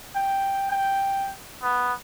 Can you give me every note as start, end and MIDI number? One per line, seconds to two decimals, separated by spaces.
0.16 0.70 79
0.71 1.31 79
1.63 1.93 59